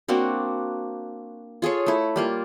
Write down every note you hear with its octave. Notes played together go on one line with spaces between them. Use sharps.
A#3 C4 D4 F#4
F4 G#4 A4 C#5
A3 E4
G3 A#3 F4